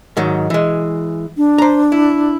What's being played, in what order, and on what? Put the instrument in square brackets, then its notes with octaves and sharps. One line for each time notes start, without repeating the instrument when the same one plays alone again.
[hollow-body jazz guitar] G#2 D#3 F#3
E3 G#3
[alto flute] D4
[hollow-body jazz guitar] C5 A#5
E4